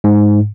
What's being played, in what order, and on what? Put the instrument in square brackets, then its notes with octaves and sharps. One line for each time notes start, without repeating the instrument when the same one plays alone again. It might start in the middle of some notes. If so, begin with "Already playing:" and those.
[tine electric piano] G#2